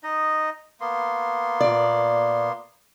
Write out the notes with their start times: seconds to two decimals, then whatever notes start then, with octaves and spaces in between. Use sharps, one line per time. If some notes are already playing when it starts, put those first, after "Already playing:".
0.03 D#4 D#5
0.81 A#3 B3 C6
1.61 A#2 D5